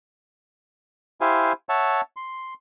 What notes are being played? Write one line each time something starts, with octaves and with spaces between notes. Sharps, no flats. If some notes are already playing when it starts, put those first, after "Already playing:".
E4 G4 C5 F5 G#5
C#5 E5 F#5 A5
C6